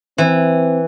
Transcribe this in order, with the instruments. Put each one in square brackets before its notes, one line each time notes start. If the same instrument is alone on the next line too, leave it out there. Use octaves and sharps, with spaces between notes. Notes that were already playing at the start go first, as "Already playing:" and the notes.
[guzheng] E3 [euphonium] C4